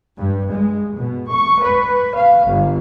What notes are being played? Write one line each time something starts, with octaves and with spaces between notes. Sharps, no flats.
G2
G#3
B2
C#6
B4
F5
G1